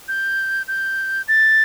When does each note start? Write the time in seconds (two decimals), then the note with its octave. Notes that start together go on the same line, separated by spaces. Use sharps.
0.08 G6
0.68 G6
1.28 A6